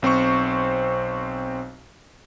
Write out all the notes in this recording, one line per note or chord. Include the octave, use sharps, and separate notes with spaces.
B1 C4 C5 C#6